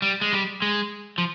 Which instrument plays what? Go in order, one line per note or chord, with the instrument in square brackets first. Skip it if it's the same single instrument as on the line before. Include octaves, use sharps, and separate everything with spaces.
[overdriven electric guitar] G3
G#3
G3
G#3
F3